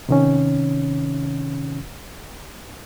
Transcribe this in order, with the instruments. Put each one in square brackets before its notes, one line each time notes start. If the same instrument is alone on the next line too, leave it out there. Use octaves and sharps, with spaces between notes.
[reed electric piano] C3 D#3 C#4